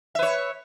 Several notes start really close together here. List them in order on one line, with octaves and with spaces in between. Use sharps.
E5 B4 C#5